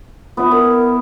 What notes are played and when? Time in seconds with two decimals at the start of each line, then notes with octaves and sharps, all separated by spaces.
0.37 B3 E4 F4
0.51 E4 A#4